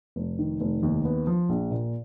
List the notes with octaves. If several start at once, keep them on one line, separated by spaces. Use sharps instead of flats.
F1
D#3
F1
D#2
B3
F3
A#1
A#2